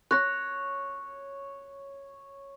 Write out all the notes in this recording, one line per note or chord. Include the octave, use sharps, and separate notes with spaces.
C#5 F#6 A#6